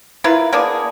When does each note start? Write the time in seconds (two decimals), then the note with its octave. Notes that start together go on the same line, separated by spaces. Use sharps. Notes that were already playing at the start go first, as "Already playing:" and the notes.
0.24 E4 F4 A#4 B4
0.52 A#3 B3 D4 G#4